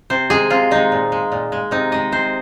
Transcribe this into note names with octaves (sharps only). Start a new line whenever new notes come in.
C3 C5
D#3 G#3 G#4
C3 F4
D#3 G#3 D#4
A#2
G#3
A#2
G#3
C3 D#4
D#3 G#3 D#5
C3 C5